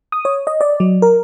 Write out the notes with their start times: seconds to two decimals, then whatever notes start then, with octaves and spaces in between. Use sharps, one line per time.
0.12 D#6
0.25 C#5
0.47 D#5
0.61 D5
0.80 F#3
1.02 A#4